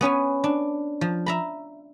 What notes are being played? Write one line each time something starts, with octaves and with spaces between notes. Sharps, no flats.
B3 C#4 B4 G#5
D4
F3
E5 A#5 B5